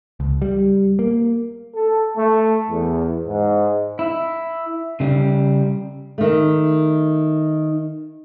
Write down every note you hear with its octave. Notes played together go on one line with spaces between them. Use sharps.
C#2
G3
A#3
A4
A3
E2
G#2
E4
C#3 G3
D#3 A3